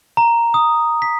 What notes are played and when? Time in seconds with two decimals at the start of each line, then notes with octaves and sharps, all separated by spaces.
0.17 A#5
0.54 D#6
1.02 B6